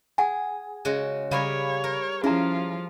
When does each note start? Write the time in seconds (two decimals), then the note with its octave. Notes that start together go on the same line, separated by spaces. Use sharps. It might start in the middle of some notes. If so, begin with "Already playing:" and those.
0.18 G#4 F#5 G#5
0.85 C#3 G#3 F#4
1.31 C#3 G3 G#4 A#4 C#5 F5 B5
1.84 A#4
2.24 F3 C#4 E4 F4 G#4 A#4 A#5